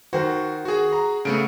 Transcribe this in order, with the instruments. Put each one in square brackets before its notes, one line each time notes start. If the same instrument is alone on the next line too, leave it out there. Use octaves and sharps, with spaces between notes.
[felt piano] D#3 C5 [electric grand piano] F#4
[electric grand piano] F#4 G#4
[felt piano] A#5
[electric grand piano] C#3 A3 B3 [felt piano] C#7 D7